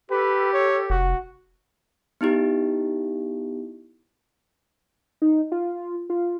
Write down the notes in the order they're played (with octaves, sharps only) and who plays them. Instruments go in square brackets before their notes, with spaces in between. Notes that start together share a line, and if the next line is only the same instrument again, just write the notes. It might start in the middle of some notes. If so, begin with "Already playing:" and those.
[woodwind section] G4 A4 [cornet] B4
[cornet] C#5
[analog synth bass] F1 [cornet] F#4
[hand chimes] B3 D#4 E4 G4
[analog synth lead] D#4
F4
F4